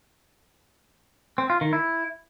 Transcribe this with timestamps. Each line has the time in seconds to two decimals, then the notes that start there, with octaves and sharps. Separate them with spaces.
1.38 C4
1.50 F4
1.61 D#3
1.73 E4